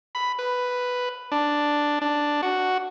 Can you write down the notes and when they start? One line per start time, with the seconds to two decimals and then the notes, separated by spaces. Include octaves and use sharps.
0.15 B5
0.39 B4
1.32 D4
2.01 D4
2.42 F#4